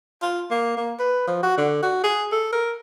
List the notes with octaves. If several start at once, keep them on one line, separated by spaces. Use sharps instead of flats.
F4
A#3
A#3
B4
F3
F#4
D3
F#4
G#4
A4
A#4